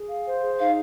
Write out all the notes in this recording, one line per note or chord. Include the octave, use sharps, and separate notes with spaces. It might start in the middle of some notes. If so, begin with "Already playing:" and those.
Already playing: G#4
F5
C5
G#4
D#4 F5